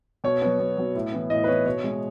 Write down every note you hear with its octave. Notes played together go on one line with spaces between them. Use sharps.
B2 C#5
F#3 B3
B2
F#3 B3
A2
E3 B3
A2 D#5
B4
E3 B3 C#5
B2 C#5
G#3 B3